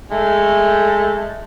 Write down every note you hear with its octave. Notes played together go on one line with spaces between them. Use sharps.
G#3 A3